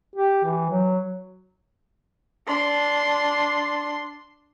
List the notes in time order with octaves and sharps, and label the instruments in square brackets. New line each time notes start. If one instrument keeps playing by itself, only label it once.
[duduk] G4
E3
F#3
[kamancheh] D4 C6